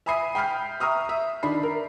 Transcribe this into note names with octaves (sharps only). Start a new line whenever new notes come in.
E5 G#5 B5 D#6 C7 D#7
G5 B5 F6 G6 C7
E5 A#5 C#6 D#6 F6
E5
D#3 D4 B5 C7
A#4